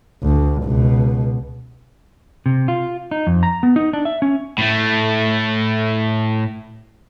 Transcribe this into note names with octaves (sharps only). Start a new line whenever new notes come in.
D2
C#2 B2
C3
F4
D#4
F2
A#5
B3
D#4
D4
E5
C#4
A2 A3